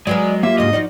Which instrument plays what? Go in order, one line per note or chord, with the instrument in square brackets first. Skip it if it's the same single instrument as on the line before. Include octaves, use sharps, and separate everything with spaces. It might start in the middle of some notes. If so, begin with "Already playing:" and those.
[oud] F#3 B3 A#4 [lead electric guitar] G#3 [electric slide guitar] D5
[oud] F#3 [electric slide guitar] A#3 F4 G4 [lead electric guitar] E5
[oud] D2 G#2 C#3 [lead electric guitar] D#5
[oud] F3 F#4 D5 [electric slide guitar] D#4